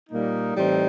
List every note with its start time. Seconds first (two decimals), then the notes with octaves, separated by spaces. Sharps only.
0.09 A#2 G3 A#3 D#4
0.55 A2 E3 G3 C4 D#4